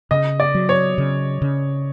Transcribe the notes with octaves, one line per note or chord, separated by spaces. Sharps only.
C#3 D#5
D5
F#3
C#5
C#3
C#3